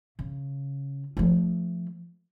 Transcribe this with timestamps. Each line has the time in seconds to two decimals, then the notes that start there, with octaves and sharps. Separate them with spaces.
0.19 C#3
1.17 F3 A3